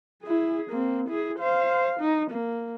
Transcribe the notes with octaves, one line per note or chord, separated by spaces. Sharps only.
E4 G#4
A#3 C4
E4 G#4
C5 F5
D#4
A#3